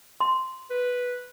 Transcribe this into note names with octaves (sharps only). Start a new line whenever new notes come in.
C6
B4